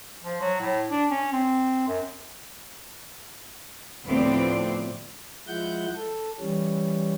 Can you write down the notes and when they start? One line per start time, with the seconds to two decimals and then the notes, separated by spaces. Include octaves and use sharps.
0.23 F3
0.41 F#3
0.60 A2
0.90 D4
1.11 C#4
1.33 C4
1.88 F#2
4.06 D2 A2 F3 B3 C4 D5
5.47 F3 G#3 E4 F#5 G6
5.96 A4
6.40 E3 G3 C#4